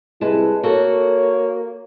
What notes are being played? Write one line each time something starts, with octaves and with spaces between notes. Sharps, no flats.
C3 G3 G#3 E4 B4 A5
A#3 F#4 A4 C#5